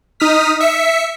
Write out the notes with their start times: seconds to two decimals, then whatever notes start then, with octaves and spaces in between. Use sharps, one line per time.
0.20 D#4 D#6 F6 B6
0.60 E5 B6 C#7